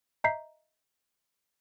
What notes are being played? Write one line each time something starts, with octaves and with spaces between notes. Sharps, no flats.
D#5 E5 A#5 G6 B6 C7